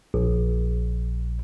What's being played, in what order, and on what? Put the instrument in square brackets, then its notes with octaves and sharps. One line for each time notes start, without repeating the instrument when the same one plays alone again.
[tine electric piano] A#1